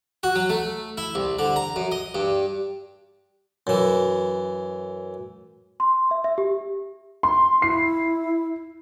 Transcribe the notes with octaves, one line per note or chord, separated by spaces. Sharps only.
F#4
F#3
A3
E4
C2
D3
A#5
F#2
D#5
G2
F#2 E3
C6
E5
E5
G4
C6
E4 C7